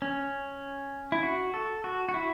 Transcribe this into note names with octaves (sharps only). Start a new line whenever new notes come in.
C#4
E4
F#4
A4
F#4
F#4
E4